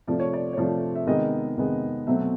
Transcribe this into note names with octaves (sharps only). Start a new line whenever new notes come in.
C3 F3 A3 D5
C#5
D5
C#5
C3 F3 A3 D5
E5
C3 D#3 G#3 B3 D#5
C3 D#3 G#3 B3
B2 F#3 A3 C4 E5